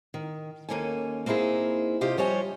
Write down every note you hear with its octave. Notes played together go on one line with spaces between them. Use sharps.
D#3
D#2 B2 A#3 C#4 A4 G#5
A#3 C4 D#4 E4 G#4
C3 F4 G4 D#5
F3 G3 C#5 D#5 G#5